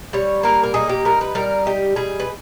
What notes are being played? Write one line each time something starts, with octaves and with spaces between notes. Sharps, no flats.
G3 C#5
A#3 A#4
A#4
D#4 G#4
G4
G3 A#4
B4
G3 A#4
D#4 G4
G3 G#4
B4